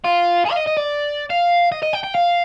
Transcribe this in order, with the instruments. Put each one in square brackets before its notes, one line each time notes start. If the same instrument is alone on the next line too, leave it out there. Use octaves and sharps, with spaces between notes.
[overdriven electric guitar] F4
G#4
F5
D#5
D#5
D5
F5
D#5
D#5
G5
G5
F5